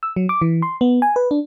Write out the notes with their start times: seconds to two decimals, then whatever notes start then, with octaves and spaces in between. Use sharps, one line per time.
0.03 E6
0.16 F#3
0.29 D6
0.42 E3
0.62 C6
0.81 B3
1.02 G#5
1.16 B4
1.31 D4